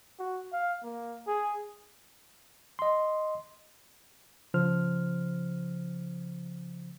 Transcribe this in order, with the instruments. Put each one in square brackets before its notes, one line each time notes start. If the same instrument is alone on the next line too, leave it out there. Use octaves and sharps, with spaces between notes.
[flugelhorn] F#4
F5
A#3
G#4
[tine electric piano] D#5 C6
[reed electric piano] C#3 F3 C5 F6